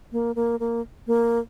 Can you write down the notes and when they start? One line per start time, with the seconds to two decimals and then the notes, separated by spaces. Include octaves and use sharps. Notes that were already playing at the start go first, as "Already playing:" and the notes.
0.12 A#3
0.36 A#3
0.60 A#3
1.07 A#3